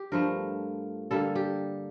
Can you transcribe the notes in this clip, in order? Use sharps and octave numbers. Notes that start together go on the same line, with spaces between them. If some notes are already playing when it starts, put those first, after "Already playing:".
Already playing: G4
G2 F3 A3 A#4
D3 G3 A#3 A4
G4